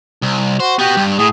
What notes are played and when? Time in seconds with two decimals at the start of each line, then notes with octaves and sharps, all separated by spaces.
0.22 C2
0.60 F#4 C5
0.79 B3 F#4 G4
0.97 G2
1.19 A2 G#4